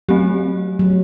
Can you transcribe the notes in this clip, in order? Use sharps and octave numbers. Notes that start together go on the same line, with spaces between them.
F#3 A3 C4 G4
F#3